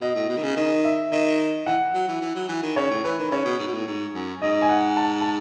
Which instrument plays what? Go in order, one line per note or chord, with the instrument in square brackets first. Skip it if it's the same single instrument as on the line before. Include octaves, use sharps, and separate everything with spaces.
[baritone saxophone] B2 [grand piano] D#5
[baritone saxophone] A2
B2
D#3
C#3
[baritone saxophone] D#3 [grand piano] D#5
[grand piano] E5
[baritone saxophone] D#3 [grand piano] D#5
[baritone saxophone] E3 [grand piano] F#5
[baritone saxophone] F#3
E3
E3
F#3
E3
D#3
[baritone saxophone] C#3 [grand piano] C#5
[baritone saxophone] A2
[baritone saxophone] E3 [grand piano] B4
[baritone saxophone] D#3
[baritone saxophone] C#3 [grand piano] C#5
[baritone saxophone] B2
G#2
B2
A2
G#2
F#2
[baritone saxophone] G#2 [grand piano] D#5
[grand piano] G#5
F#5
A5
A5